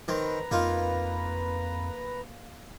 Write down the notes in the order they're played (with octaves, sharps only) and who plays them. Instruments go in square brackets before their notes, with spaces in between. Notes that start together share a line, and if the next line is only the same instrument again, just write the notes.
[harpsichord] D#3 C4 [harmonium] B4 A#5
[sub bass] F2 [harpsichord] A#3 D#4 F4